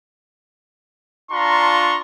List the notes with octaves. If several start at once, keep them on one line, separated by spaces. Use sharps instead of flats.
D4 F4 A5 A#5 C6 C#6